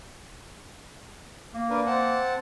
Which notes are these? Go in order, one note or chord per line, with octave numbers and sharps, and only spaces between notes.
A#3
D4 A#4 B4
C4 F#5 A5